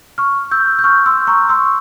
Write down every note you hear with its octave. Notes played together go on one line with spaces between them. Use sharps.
C#6 F6
E6 G6
G6
C#6 F6
C6 E6
A#5 C#6
C6 E6